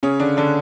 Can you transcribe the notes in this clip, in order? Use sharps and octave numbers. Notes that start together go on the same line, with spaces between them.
C#3 C#4
D3 D4
D3 D4